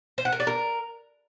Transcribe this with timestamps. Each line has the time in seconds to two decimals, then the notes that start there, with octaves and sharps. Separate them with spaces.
0.18 C5
0.25 F#5
0.32 A#4
0.40 D5
0.47 A#4